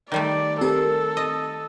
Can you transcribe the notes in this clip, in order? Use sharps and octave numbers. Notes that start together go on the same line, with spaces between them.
D#3 G3 A3 D5
C4 G4 A4 A#4
D#5